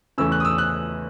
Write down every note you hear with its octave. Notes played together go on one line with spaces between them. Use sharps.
E2 C#3 E3 A3 C#4 E6
F#6
D#6
E6
F#6